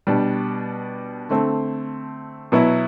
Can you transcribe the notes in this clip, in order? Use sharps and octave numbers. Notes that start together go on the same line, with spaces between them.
B2 G3 D4
D3 A3 C4
B2 F#3 B3 E4